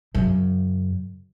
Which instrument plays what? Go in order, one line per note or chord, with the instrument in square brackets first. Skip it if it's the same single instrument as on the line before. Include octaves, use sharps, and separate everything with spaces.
[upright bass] F#2 C#3